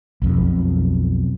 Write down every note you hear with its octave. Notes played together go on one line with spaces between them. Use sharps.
B1 F2